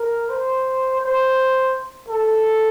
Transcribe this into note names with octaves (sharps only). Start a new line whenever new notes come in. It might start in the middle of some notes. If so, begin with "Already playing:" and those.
Already playing: A#4
C5
C5
A4